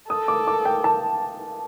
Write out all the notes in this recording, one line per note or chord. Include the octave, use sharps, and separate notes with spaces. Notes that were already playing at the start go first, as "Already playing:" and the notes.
A4 D#6
D6
D6
G5
A5